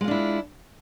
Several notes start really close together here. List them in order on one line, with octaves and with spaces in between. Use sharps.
G#3 F4 D4 E4